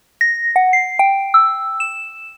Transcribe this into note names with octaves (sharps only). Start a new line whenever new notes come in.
A#6
F#5
C7
G5
E6
E7